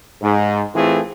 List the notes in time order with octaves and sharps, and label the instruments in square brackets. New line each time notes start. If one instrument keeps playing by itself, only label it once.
[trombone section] G#2
A2 E3 A3 C4 F4 G#4